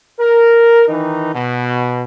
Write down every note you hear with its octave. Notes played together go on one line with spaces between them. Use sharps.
A#4
D#3 E3 D#4
B2